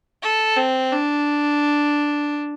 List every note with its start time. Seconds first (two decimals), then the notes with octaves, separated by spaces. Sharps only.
0.23 A4
0.57 C4
0.92 D4